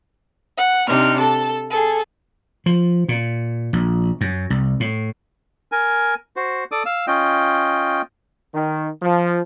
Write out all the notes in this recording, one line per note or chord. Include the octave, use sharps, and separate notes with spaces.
F#5
C3 D4 D#4 F6
A4 A5
G#4 A4
F3
A#2
A#1
F#2
C2
A2
A#4 G#5
F#4 C5
A4 D5 D6 D#6
F5 E6
C#4 F4 D#5 G5
D#3
F3